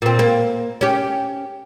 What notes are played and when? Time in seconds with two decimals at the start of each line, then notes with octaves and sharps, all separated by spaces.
0.02 A#2 C4
0.19 A#3
0.81 C#4 G4